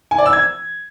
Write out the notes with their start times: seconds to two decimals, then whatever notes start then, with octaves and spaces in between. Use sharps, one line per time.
0.11 G#5
0.18 D5
0.26 E6
0.33 G#6